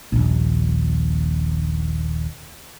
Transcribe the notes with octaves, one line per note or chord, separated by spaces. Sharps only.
D#1 A#1